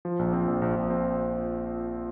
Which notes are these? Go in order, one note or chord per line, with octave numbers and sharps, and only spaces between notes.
F3
A#1
C4
A#1
A#1
A#1
C4